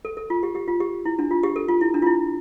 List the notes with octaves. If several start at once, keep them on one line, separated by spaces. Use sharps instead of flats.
A4
A4
F4
G4
G4
F4
G4
E4
D4
F4
G4
A4
F4
E4
D4
F4
E4